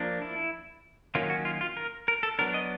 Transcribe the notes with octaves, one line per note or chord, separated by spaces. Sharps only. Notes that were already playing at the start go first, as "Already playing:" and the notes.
Already playing: F3 A#3 D4
E4
D#3 F#3 A#3 C#4 F4
F#4
F4
F4
A#4
A#4
A4
F#3 B3 D4 A#4
D#5